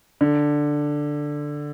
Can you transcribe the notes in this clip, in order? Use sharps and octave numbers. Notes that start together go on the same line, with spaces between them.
D3